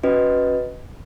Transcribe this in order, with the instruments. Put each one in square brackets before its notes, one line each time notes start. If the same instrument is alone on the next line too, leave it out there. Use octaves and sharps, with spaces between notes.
[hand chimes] C#4 F#4 B4 D#5